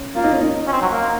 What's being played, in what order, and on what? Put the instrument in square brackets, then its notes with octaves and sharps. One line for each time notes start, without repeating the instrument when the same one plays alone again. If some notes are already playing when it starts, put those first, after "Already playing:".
Already playing: [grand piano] C#4
[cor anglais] A#3 [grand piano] F4
[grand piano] D#4
C#4
D#4
[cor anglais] C#4
C4
F#3
A#3